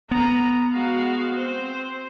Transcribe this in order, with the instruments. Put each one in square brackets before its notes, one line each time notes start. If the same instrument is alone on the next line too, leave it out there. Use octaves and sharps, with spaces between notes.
[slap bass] B3 [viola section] A#5
[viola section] G#3 F#4 F5
C4 C5